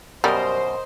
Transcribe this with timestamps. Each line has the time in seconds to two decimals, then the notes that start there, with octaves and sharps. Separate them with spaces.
0.24 F#2 B2 G3 A#4 C5 D#5